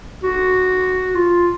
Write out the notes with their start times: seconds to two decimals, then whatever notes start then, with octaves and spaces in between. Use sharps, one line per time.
0.23 F#4
1.15 F4